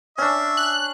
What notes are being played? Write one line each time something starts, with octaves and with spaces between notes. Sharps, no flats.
C#4 D4 E5
F#6